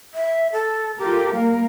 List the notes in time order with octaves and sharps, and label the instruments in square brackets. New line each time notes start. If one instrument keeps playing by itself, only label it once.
[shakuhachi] E5
A4
[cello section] F4 A4 A#4 [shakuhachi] G4
[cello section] G3 A#3 A#4 [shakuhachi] F5